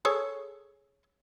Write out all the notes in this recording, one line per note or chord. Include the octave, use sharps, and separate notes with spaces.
G#4 A4 C#5